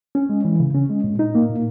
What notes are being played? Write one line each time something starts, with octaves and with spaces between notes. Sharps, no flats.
C#4
G#3
E3
C#3
C#4
G#3
A#2
D#4
A#3
A#2